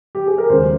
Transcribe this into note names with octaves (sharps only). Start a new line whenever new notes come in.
G4
G#4
A#4
D#2 C#3 F3 G#3 C5